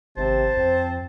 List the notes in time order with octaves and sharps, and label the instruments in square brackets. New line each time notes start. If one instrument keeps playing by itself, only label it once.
[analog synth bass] G#1 [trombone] C3 [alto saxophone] C5 [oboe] A5
[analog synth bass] F2 [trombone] C4